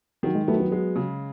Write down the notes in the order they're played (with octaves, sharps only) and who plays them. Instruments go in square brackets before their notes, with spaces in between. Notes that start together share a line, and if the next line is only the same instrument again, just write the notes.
[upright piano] D#3 [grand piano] F#3
[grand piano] G#3
[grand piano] F#3 A3 [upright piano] B3
[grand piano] F#3
[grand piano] F#3 [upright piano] G#3
[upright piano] C#3